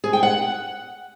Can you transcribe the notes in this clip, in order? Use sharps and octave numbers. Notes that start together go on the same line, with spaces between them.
G#4
G5
F#5